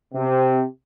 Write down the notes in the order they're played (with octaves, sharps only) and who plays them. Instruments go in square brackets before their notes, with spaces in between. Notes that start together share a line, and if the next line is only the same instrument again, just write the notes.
[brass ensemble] C3